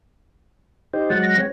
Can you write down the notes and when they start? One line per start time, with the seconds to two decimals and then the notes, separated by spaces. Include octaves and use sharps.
0.93 D#4 G4 C5
1.10 F#3 G#3 F#5 A6
1.23 A#6
1.38 C4 C#5